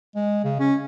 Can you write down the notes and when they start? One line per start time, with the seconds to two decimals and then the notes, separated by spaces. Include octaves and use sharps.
0.15 G#3
0.44 C#3
0.60 C#4